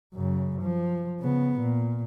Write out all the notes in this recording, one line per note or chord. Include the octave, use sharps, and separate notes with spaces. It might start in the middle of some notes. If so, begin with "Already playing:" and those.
F#2 C#3
F3
C#3 B3
A#2